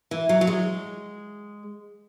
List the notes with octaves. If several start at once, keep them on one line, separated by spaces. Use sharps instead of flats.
E3
F#3
F#3
G#3